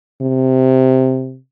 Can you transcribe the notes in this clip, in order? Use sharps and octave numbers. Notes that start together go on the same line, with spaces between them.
C3